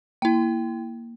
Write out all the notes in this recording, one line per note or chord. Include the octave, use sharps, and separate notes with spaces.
A#3 E4 G5